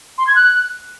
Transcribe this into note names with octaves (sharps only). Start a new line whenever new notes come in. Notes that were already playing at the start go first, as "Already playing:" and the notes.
C6
G#6
F#6